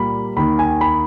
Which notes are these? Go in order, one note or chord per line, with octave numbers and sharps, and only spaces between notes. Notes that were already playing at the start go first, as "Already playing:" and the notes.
Already playing: A#2 G3 A#3 B5
D#2 D#3 A#3 B5
G#5
B5